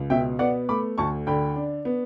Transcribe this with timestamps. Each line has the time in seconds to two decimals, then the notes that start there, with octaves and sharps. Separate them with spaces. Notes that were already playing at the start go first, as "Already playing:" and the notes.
Already playing: C#2
0.10 B2 E5 G5
0.39 B3 D5 F#5
0.69 A3 B5 D6
0.98 D2 A5 C#6
1.27 D3 G5 B5
1.56 D4
1.85 B3